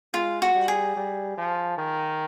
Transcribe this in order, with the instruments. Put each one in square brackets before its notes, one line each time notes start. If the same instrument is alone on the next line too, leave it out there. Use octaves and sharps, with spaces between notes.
[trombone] G#3 [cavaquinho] F4
[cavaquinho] F#4
[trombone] G3
[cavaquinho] G#4
[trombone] G3
F3
D#3